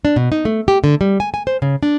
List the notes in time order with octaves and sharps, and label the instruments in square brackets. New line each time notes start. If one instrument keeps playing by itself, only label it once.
[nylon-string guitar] D4
B2
D#4
A3
G4
D3
G3
G#5
G#5
C5
C#3
D4